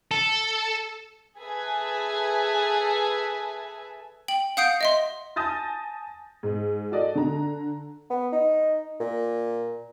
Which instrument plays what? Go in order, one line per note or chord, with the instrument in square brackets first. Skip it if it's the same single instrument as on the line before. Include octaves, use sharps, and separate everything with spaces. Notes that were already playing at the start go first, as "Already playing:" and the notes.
[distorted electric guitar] A4
[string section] G#4 A4 B4 E5 G#5
[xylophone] G5 F#7
F5 F#5 D#6 G6 C7 D7
D#5 E5 C6
[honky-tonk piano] G#5 A5 D#6 G6 A6 A#6
G#2
F#4 A4 D5 D#5
D3 A#5
[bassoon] B3
D#4
A#2